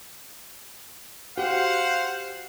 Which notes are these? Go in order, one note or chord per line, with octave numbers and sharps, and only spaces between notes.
F#4 G4 C5 F5 F#5